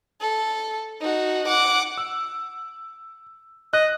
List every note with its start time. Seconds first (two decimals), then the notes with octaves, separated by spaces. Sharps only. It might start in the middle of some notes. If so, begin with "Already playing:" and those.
0.21 A4
1.01 D#4 F#4
1.48 F#5 D6
1.98 E6
3.73 D#5 F#6